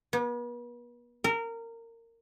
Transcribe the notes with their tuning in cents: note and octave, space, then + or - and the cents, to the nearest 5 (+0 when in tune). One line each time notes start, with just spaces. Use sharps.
B3 -40
A#4 -20